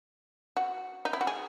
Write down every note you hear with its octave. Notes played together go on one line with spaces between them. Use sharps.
F#4
D#4
E4
F#4
G#4